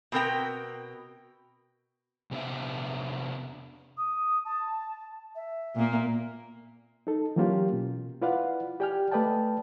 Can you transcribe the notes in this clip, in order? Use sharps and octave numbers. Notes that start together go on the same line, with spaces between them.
B2 C4 A#4 G5
C3 B3 D4 E5
D#6
A5
E5
A#2 A#3
D#4 A4
E3 F#3 A#3 C#4 F4 G4
B2
E4 F4 B4 D5 F5 F#5
G4 D5 G5 G#5 F6
A3 B4 D5 D#5 G5 A5